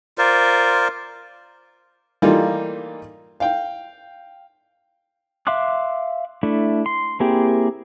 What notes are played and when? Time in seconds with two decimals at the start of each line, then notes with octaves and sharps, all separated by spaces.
0.18 F4 A#4 C5 D5
2.22 E3 G3 A3 A#3 D#4 F4
3.40 F5 G5
5.47 E5 F5 C6 D6 F#6
6.43 A3 D4 E4
6.86 C6
7.20 A#3 C4 E4 G4 G#4